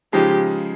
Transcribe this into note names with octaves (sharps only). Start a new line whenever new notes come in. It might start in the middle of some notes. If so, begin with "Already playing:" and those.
C#3 F3 G#3 D#4 G4